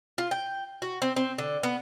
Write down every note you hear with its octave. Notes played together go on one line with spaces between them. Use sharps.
F4
G5
F#4
C4
C4
D3
B3